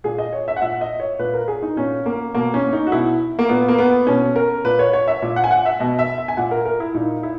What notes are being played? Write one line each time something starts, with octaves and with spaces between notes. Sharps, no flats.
A#2 G#4
D#5
C#5
E5
F#5
A#2 E5
D#5
C#5
A#2 B4
A#4
G#4
D#4
A#2 C#4
A#3
B2 A#3
C#4
D#4
F#4
B2 E4
A#3
A#2 B3
A#3
B3
B2 C#4
A#4
A#2 B4
C#5
C#5
E5
A#2
F#5
G#5
F#5
E5
B2 D#5
E5
E5
G#5
A#2 F#5
A#4
A#4
E4
A#2 D#4
E4